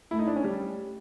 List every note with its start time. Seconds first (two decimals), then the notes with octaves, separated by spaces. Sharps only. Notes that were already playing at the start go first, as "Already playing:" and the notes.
0.11 A3 E4
0.19 D#4
0.28 D4
0.36 C#4
0.44 G3